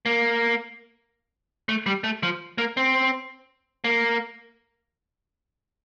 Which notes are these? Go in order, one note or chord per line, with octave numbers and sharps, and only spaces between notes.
A#3
A3
G3
A3
F3
A#3
C4
A#3